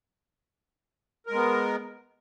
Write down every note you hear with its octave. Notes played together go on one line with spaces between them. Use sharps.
G#3 B3 A#4